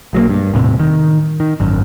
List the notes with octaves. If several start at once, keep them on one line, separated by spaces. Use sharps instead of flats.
B1 F#3 G3 A#3
G2
E1 A2 C3
D#3
D#3
G#1 F#2